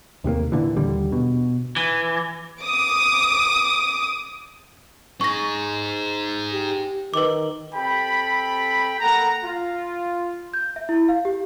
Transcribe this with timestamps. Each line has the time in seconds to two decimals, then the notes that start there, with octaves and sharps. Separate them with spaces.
0.24 D#2 C3 G#3 A#3
0.52 A#2 D3 E3
0.76 D#2 D3 G3
1.12 B2
1.76 E3
2.61 D6 D#6
5.21 D#4 G#4 C#6 A#6
6.53 G4
7.14 D#3 B4 D6
7.74 C4 G4 A4 G5 B5
9.01 A#3 A4 F#5 A#5
9.44 F4
10.53 G6
10.76 E5
10.89 E4
11.09 F5
11.25 G4